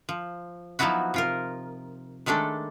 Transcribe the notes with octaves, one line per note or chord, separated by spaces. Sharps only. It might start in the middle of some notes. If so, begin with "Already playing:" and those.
F3
F3 F#3 B3 D#4 E4 F#4
C3 F4 A#4
D#3 G#3 A3 D4 A4